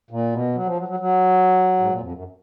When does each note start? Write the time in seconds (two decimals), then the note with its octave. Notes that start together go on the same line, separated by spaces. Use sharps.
0.11 A#2
0.33 B2
0.55 F#3
0.66 F3
0.78 F#3
0.88 F#3
1.00 F#3
1.79 G#2
1.89 A#2
2.01 F2
2.12 F#2